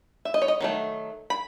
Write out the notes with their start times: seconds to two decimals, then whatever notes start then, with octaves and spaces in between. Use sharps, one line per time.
0.25 E5
0.34 D#5
0.42 C#5
0.48 D#5
0.61 D#3 F#3 A3
1.30 B5